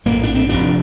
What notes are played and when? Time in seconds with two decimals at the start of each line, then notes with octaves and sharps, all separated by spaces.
0.05 A#1 A2 A#3
0.23 D4
0.34 C4
0.49 F1 F2 C3 D4